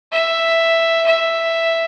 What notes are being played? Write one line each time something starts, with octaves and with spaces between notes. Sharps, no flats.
E5
E5